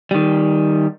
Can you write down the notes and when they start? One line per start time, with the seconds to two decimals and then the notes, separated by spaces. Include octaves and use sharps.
0.11 D#3 G3